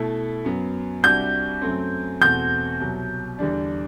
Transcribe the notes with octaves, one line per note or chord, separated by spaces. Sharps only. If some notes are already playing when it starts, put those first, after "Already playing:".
Already playing: B2 A3 E4 A4
F#2 F#3 B3
C2 C3 G3 D4 F#4 G6
F#2 F#3 A3 C4
E2 B2 A3 C4 F#4 G6
C2 B2 F#3
E2 D3 G3 D4